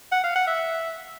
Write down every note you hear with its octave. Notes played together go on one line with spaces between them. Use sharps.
F#5
F5
F#5
E5